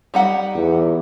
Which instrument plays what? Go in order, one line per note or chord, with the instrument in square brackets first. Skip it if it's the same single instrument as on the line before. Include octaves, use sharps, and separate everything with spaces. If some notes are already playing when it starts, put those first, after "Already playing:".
[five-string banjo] G3 D#4 F#5
[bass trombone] E2